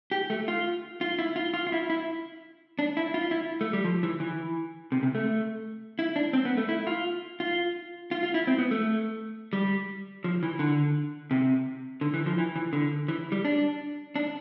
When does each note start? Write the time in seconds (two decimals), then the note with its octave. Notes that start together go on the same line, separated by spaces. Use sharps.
0.11 G4
0.30 A3
0.48 F4
1.01 F4
1.19 E4
1.36 F4
1.54 F4
1.67 F4
1.72 E4
1.90 E4
2.79 D4
2.97 E4
3.14 F4
3.31 E4
3.61 A3
3.73 G3
3.84 F3
4.03 E3
4.20 E3
4.92 C3
5.03 C3
5.15 A3
5.99 E4
6.16 D4
6.33 C4
6.45 B3
6.57 A3
6.69 E4
6.87 F4
7.40 F4
8.11 F4
8.23 F4
8.34 E4
8.47 C4
8.58 B3
8.71 A3
9.53 G3
10.24 F3
10.43 E3
10.59 D3
11.31 C3
12.01 D3
12.14 E3
12.26 F3
12.38 E3
12.56 E3
12.73 D3
13.08 E3
13.32 G3
13.45 D4
14.16 D4